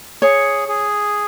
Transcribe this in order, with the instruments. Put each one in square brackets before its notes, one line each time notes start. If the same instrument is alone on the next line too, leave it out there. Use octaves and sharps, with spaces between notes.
[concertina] G#4 [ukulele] C#5
[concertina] G#4